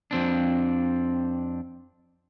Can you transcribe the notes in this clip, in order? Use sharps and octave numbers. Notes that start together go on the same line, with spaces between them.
F2 C4 D4